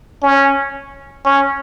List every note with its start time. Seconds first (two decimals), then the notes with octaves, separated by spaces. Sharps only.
0.23 C#4
1.25 C#4